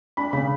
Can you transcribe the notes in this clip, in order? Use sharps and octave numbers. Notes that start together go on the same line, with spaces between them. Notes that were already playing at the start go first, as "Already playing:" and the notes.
D4 B5
C#3 B5